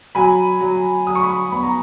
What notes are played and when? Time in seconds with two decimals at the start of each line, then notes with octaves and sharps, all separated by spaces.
0.15 F#3 G#5 B5
0.61 F#3
1.07 F#3 D#6
1.15 C#6
1.23 B5 D#6
1.52 B3 B5
1.63 A#5